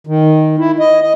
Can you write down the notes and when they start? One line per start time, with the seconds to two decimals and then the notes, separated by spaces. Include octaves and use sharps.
0.07 D#3
0.59 E4
0.79 D#5
1.02 D#5